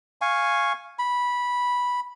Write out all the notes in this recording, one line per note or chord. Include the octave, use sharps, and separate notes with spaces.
F5 G#5 C#6
B5